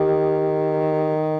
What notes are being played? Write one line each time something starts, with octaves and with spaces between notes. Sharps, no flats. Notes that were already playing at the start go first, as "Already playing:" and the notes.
Already playing: D#3 G4